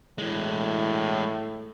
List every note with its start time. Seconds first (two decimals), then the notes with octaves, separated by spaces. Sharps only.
0.18 A2 E3 G#3